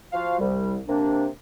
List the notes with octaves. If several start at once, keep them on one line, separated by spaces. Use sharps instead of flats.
F3 F4 F#4 F5
C2 G3
C3 A#3 D4